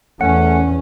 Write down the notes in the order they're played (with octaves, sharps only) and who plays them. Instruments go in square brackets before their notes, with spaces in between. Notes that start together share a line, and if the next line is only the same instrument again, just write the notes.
[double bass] E2 [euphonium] A3 [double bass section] C#4 [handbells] F#5